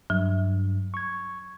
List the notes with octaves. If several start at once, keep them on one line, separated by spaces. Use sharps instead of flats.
G2 F#3
C#6 G#6